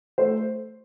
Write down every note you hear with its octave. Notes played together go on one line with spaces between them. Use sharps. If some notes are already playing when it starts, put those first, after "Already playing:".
A3 C5